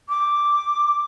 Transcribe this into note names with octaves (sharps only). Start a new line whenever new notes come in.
D6